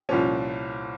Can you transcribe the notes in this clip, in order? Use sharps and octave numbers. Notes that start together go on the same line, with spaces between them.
C2 A#2 F3 C#4